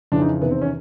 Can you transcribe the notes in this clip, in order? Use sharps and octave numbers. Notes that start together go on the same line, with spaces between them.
F2 C#3 E3 D4
D#4
E2 C3 D#3 B3
C4
C#4